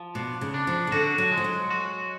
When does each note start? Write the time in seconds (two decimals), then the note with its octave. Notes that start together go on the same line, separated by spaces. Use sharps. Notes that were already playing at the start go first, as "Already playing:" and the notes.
Already playing: F3
0.15 B2 D4
0.41 C#3
0.54 D4
0.67 F3
0.87 C#3
0.92 D3 F#4
1.18 F#3
1.32 G#3
1.37 F3
1.44 F#3
1.70 F#4